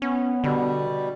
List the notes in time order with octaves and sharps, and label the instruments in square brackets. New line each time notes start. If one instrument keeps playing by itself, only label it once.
[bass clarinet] B3 [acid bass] C#4
[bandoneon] B2 G3 [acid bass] D3